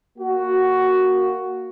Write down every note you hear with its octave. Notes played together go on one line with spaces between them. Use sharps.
A#3 F#4